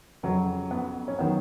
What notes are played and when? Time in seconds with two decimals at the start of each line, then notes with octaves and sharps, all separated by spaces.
0.23 F2 C#3 F#3 C#4
0.71 B3
1.08 C#4
1.19 D#3 F#3 B3